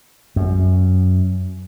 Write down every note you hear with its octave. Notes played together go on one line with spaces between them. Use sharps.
F#2